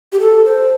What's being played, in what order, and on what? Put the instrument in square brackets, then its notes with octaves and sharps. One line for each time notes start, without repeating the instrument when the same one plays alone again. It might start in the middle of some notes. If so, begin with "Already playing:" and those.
[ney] G4
A4
C5